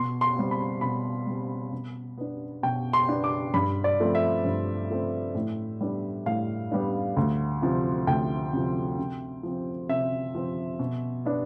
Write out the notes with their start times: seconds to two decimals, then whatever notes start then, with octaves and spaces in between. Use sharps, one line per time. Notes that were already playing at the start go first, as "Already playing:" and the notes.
Already playing: B2 C6
0.21 C6
0.36 G3 C4
0.51 B5
0.81 B2 B5
1.27 G3 C4
1.73 B2
2.18 B3 D4
2.63 B2 G5
2.93 C6
3.09 B3 D4
3.24 D6
3.54 G2 B5
3.84 D5
4.00 F3 A3 C4
4.15 E5
4.45 G2
4.90 F3 A3 C4
5.35 A2
5.81 G3 B3 D4
6.26 A2 F5
6.71 G3 B3 D4
7.17 D2
7.62 C3 F3
8.07 D2 G5
8.53 C3 F3
8.98 C3
9.43 F3 C4
9.89 C3 E5
10.35 F3 C4
10.79 B2
11.25 B3 D4